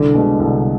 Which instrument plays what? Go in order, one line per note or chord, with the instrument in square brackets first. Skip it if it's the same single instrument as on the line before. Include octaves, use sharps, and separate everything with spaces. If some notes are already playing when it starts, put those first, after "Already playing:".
Already playing: [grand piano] C2 [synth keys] D3
[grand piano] B2 G#3
C2